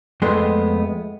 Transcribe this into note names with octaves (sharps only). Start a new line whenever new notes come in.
F2 G#3 A3 B3 C6